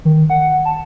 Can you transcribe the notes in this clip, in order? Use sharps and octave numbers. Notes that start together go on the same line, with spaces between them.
D#3
F#5
A5